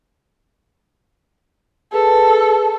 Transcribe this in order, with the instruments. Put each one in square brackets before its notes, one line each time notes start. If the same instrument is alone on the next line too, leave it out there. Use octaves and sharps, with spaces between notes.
[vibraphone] G#4 B4 [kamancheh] A4